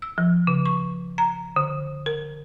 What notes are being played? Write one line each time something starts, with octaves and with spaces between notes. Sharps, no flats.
E6
F3
C#3
C#6
A#5
D3
A#4